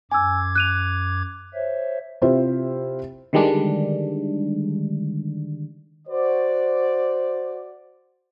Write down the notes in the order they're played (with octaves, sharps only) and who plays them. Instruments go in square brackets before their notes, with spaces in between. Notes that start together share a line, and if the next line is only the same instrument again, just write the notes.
[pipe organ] F#2 D6 G#6 [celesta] G#5 E6
[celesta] F#6 D#7 F7
[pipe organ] C5 C#5 E5
[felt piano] C3 E4 F4 G4 C5
[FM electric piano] D3 D#3 G3 G#3 D4
[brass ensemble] F#4 C5 D5